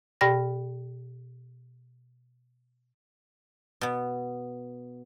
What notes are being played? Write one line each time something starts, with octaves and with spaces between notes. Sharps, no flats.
B2 G4 D5 G5 B5 A#6
B2 B3